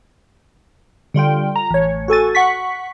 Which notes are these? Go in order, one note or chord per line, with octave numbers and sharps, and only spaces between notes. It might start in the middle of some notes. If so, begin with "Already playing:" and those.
D3 G3 F4 G5
A#5
A1 C#5
F#4 A4 G#5 A6
F#5 C#6 B6